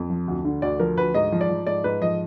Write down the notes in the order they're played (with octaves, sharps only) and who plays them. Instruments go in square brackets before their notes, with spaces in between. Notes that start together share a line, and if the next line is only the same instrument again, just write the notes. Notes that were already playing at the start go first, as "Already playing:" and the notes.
Already playing: [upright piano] F2
F3
D2
D3
D2 D5
F3 A#4
D2 B4
G#2 D#5
F3
D5
F3
G#2 D5
G#2 B4
F3 D#5